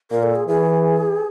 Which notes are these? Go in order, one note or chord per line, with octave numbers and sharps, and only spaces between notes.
A#2 A#4
A4
G#4
E3 G#4